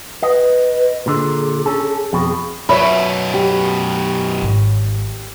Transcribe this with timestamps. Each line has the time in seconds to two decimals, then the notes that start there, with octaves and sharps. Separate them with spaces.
0.23 B4 D#5
1.06 A#2 D3 G#4
1.66 C#4 A4
2.13 F2 B2
2.69 F#2 B2 C#5 E5 B5
3.34 G4
4.42 G#1